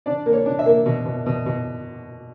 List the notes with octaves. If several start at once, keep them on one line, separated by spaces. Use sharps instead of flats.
D4 D5
A#3
C#5
D4
E5
A#3
B2
B2
B2
B2